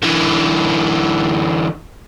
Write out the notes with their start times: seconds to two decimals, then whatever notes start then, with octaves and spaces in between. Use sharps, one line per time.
0.03 D3 E3